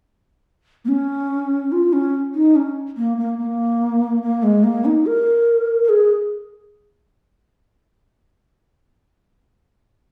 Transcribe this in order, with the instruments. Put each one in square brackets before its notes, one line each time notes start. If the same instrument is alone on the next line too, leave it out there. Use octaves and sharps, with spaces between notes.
[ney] A#3
C#4
F4
C#4
D#4
C#4
A#3
A#3
A#3
A#3
G#3
A#3
D#4
A#4
A#4
G#4